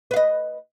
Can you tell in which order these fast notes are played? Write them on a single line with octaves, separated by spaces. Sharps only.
B4 F5 D#5